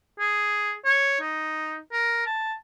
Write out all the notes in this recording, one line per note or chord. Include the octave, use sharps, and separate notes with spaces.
G#4
C#5
D#4
A#4
A5